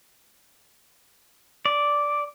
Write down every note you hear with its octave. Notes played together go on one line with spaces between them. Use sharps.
D5